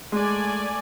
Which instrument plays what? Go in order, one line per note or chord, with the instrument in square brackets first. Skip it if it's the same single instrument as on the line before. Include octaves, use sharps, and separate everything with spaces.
[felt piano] G#3 [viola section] A3 D5 G#5